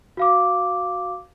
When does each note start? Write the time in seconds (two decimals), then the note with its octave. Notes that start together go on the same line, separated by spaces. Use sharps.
0.17 F#4 F5 D6